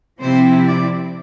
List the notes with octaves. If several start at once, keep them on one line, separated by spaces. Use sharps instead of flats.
C3 F3 C4 E4 C5
D5